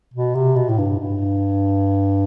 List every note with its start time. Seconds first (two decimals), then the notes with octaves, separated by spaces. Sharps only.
0.14 B2
0.35 C3
0.56 B2
0.69 A2
0.78 G2
0.99 G2